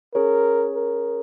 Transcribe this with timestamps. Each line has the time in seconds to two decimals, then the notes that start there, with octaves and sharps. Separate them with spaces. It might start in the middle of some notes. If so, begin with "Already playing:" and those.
0.14 C#4 G#4 A#4 C#5
0.75 A#4